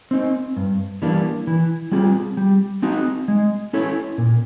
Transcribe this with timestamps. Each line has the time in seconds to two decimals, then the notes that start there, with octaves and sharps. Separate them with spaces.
0.11 C4 D#4
0.57 G2
1.02 E3 G3 A#3 D4
1.47 E3
1.92 G3 C4 F4 G#4
2.37 G3
2.82 C4 D#4 F#4
3.28 G#3
3.73 C#4 E4 A4 C#5
4.18 A#2